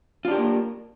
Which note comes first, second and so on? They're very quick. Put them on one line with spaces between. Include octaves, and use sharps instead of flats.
F4 D4 G4 A#4 A#3